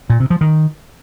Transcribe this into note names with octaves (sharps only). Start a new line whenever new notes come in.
A#2
C3
F3
D#3